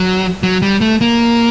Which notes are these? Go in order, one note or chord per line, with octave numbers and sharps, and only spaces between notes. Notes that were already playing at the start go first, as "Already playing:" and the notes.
Already playing: F#3
F#3
G3
A3
A#3